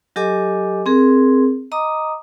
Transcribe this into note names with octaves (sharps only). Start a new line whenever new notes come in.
F#3 G4 A4 D#5 G#5 D6
C4 G#4 A#4
D#5 A#5 D6 D#6